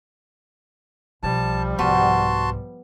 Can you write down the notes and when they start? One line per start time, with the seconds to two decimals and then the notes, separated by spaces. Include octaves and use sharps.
1.23 B1 F3 G3 A5
1.79 C2 G#2 B3 F#4 A5 C6